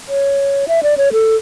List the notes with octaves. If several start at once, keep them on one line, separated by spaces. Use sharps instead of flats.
C#5
E5
D5
C#5
A4